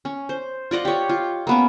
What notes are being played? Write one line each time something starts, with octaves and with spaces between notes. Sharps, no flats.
C#4
C5
F4 D5 D#5 F#5
G4 C#5
F4
A#3 B3 C#4